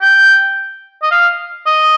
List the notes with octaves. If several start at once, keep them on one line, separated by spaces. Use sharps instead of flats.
G5
D#5
F5
D#5